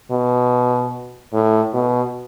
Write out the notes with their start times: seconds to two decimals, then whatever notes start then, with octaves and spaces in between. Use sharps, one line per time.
0.11 B2
1.33 A2
1.74 B2